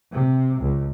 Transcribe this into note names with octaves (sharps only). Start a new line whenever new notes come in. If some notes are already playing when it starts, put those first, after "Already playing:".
C3
C#2